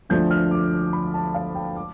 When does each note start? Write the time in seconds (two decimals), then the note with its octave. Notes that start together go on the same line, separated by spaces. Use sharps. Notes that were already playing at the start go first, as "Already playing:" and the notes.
0.09 D2 D3 F3 A3 D4 G6
0.31 F6
0.51 D6
0.93 B5
1.14 A5
1.34 F5
1.55 G5
1.76 D6